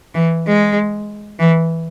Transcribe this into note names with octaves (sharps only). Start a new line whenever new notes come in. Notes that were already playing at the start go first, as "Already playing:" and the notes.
E3
G#3
E3